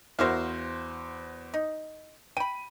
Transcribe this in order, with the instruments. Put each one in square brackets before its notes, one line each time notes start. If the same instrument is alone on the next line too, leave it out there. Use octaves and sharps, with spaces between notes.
[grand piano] E2 F#4 C5 [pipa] A#4 E5 F5
[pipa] D#4
[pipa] G5 B5 [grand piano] D#7